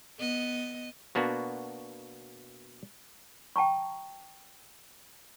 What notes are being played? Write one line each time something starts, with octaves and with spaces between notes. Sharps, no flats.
B3 D#5
B2 A#3 B3 D4 F#4
G5 A5 A#5 C#6